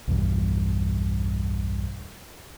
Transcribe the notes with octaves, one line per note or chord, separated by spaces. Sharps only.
B1 E2 G2